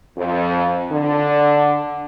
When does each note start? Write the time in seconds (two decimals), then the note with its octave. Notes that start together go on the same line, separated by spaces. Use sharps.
0.17 F2
0.91 D3